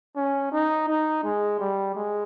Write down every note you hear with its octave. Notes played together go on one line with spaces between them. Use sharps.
C#4
D#4
D#4
G#3
G3
G#3